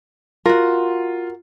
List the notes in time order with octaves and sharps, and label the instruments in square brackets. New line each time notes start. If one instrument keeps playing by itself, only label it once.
[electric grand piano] F4 [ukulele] F#4 A#4